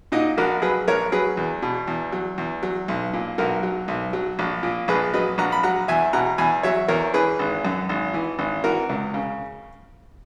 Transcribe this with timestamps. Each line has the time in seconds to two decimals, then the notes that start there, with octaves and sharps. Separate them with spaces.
0.12 A#2 D#4 F#4
0.38 A#1 F#4 A#4
0.62 F#3 G#4 B4
0.88 A#1 A#4 C#5
1.12 F#3 G#4 B4
1.37 E2
1.62 B2
1.88 E2
2.12 F#3
2.38 E2
2.63 F#3
2.88 B1
3.13 A#2
3.38 B1 F#4 A#4
3.63 F#3
3.88 B1
4.13 F#3
4.39 A#1
4.63 A#2
4.88 A#1 G#4 B4
5.14 F#3 B4 D#5
5.38 A#1 F#5 A#5
5.52 B5
5.63 F#3 F#5 A#5
5.88 E2 E5 G#5
6.13 B2 F#5 A#5
6.38 E2 G#5 B5
6.63 F#3 C#5 E5
6.88 E2 A#4 C#5
7.13 E3 G#4 B4
7.39 G#1
7.65 F#2
7.89 G#1
8.14 E3
8.39 G#1
8.64 E3 F#4 A#4
8.89 C#2
9.14 C#3